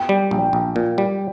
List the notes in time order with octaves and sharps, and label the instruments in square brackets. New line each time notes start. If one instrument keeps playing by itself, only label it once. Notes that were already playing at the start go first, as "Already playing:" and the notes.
Already playing: [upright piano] G5
[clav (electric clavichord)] G3
A#1
A#1
A#2
G3